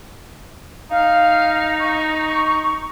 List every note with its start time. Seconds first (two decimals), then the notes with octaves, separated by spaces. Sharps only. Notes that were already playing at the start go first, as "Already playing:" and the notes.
0.91 D#4 F5
1.80 C#6